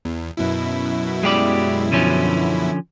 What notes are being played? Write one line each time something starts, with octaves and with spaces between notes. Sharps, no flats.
E2
F#2 B2 E4
G#3 G4 D5
D3 F3 C#4